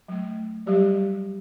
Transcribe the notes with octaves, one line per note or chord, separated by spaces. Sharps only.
F#3 A3
F#3 G3 G4 D5